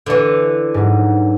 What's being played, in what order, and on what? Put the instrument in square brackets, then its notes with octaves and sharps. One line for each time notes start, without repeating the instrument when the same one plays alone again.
[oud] D3 E3
[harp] G#2 F#3